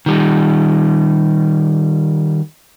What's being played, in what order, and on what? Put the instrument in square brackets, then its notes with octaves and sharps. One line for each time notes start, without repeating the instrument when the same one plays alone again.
[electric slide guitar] D#3 G3